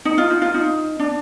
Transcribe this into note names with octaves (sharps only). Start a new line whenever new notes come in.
D#4
F4
D#4
F4
D#4
D4